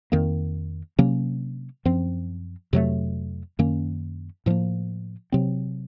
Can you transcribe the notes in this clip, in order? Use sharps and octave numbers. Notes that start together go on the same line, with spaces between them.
F2 D#3 A#3
C3 F#3 A#3 C#4
F#2 F3 C4
F2 C3 F#3 A3
F#2 D#3 A#3 C#4
A2 F3 A#3
C3 F#3 C4